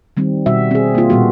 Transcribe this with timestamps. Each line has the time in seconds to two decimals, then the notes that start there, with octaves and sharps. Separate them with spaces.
0.17 D#3 G3 C4
0.46 B2 G3 F#4 E5
0.71 C4 G#4
0.95 A#3 F4
1.10 A#2 G3 B3 F#4